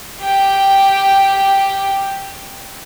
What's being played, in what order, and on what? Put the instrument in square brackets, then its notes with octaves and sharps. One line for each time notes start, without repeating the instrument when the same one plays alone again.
[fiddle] G4 G5